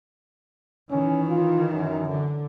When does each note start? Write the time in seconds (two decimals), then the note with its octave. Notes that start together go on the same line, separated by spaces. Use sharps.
0.91 D#3 E3 C#4
1.30 F4
1.72 F#2
2.08 D3